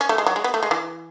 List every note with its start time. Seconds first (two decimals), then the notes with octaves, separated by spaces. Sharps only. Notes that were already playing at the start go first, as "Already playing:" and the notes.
0.01 C#4
0.09 A3
0.18 G#3
0.26 F#3
0.36 G#3
0.44 B3
0.54 A3
0.63 G#3
0.71 E3